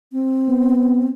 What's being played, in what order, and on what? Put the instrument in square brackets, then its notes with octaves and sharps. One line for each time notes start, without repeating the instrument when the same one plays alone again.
[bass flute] C4
[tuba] B3